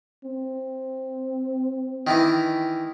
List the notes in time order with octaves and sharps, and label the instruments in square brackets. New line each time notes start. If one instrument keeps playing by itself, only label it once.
[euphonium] C4
[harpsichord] D#3 E3 D6